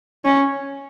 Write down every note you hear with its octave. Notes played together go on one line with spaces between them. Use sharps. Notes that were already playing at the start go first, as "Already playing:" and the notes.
C#4